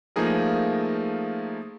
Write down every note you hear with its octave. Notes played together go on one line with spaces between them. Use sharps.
F3 A3 A#3 D#4 G#4 A#4